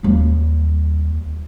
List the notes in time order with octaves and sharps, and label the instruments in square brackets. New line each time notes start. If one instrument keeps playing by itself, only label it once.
[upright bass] D#2 G3